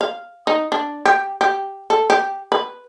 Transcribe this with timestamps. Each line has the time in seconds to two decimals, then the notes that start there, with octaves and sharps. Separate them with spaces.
0.01 F5
0.47 D#4
0.72 D4
1.05 G4
1.41 G4
1.90 A4
2.10 G4
2.52 B4